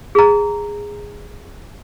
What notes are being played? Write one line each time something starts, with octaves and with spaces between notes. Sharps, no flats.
G#4 A#5